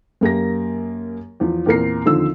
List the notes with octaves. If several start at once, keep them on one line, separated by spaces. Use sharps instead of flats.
F#2 A#3 G4 A#6
E2 F3
E2 A#2 C4 A#4 A#5 C7
D#2 D3 D#3 F3 C4 E6